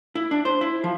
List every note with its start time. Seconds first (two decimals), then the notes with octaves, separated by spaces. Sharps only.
0.15 E4
0.31 D4
0.45 C5
0.61 E4
0.84 F3